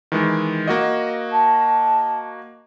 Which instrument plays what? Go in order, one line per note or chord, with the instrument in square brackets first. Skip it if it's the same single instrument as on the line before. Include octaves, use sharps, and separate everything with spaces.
[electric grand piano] D#3 E3 G#3
A#3 F#4 D#5
[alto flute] A5